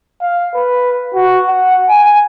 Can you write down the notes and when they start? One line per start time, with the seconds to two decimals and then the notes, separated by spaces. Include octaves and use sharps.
0.22 F5
0.55 B4
1.15 F#4
1.49 F#5
1.90 G#5